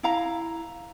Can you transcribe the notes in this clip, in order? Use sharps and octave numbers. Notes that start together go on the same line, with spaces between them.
E4 F5 A#5